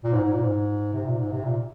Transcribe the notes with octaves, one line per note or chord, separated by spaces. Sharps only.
A#2
G#2
G#2
A#2
G#2
C3
A#2
G#2
C3
A#2